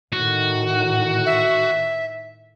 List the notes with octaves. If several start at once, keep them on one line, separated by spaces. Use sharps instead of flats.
A2 D#3 F#4
E5